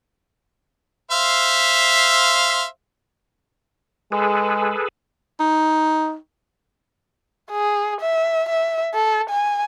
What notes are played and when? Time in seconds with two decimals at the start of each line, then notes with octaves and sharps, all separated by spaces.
1.11 C5 E5 F5
4.12 G#3 G#4 A4 B4
5.40 D#4
7.52 G#4
8.01 E5
8.50 E5
8.95 A4
9.30 G#5